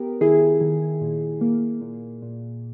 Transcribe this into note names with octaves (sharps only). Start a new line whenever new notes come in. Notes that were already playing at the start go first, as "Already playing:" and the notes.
Already playing: B3 G4 A#4
D#3 E4 G#4
D#3
A#2
A#3
A#2
A#2